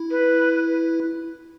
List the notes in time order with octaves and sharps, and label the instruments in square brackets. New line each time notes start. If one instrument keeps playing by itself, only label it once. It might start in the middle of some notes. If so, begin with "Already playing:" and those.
Already playing: [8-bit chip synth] E4
[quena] B4